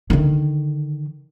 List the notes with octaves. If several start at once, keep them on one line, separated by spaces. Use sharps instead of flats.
D3 D#3